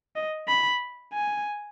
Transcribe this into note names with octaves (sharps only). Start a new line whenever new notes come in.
D#5
B5
G#5